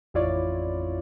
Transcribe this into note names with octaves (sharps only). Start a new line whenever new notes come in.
A1 F2 E4 F4 C#5 D5